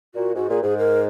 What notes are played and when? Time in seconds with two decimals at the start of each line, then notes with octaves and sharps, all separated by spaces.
0.15 A#2 F#4
0.35 G#2 F#4
0.49 A#2 G#4
0.63 G#2 G#4
0.78 A#4